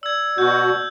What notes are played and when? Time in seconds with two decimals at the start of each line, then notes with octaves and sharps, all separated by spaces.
0.03 D5 E6 G#6
0.38 B2 F#4 G6